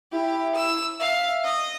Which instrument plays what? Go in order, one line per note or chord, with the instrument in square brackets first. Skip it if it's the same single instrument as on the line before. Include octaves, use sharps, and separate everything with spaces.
[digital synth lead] E4 [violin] G4
[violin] E6
[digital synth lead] E5 [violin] F5
[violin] D#5